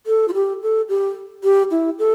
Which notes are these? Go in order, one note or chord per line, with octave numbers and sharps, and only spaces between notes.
A4
F4
G4
A4
G4
G4
E4
A4